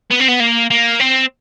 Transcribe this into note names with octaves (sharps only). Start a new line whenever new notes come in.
B3
C4
B3
A#3
A#3
C4